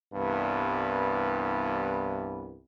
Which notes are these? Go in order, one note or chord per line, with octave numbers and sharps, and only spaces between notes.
C2 G2 E3 B3